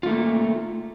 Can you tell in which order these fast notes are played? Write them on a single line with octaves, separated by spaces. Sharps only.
F4 A3 D#4 A#3